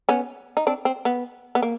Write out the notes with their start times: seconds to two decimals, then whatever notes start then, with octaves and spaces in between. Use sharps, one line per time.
0.09 B3 C#4
0.57 D#4
0.67 C4 D4
0.85 C4
1.05 B3
1.55 B3
1.62 A#3